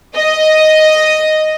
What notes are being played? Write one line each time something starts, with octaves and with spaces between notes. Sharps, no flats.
D#5